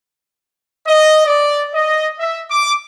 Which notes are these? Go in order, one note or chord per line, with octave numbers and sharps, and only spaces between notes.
D#5
D5
D#5
E5
D6